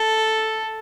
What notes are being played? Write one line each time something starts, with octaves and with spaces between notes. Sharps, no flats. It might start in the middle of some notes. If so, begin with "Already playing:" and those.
Already playing: A4